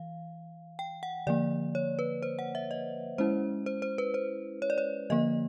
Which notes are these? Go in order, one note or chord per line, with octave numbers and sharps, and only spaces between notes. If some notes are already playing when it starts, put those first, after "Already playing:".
Already playing: E3 F5
G5
F#5
D3 F3 A#3 D5
C#5
B4
C5
F#5
E5
D#5
G#3 C#4 E4 C5
C5
C5
B4
C5
C#5
D5
C#5
D3 F3 A#3 D#5